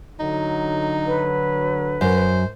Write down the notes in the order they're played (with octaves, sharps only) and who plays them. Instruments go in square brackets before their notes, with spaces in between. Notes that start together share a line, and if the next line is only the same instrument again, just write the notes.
[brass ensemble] D3 F#3 [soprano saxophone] D#4
[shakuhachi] B4
[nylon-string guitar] F#2 [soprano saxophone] C5